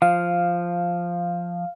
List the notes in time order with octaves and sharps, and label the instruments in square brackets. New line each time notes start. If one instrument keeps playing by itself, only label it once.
[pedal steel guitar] F3 [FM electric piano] F5